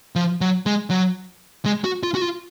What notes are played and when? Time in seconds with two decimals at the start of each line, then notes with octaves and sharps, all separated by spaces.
0.16 F3
0.41 F#3
0.66 G#3
0.90 F#3
1.65 G#3
1.84 F#4
2.03 F4
2.15 F#4
2.21 F4